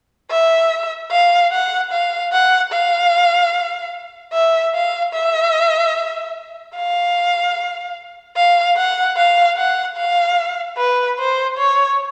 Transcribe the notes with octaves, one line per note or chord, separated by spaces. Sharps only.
E5
F5
F#5
F5
F#5
F5
E5
F5
E5
F5
F5
F#5
F5
F#5
F5
B4
C5
C#5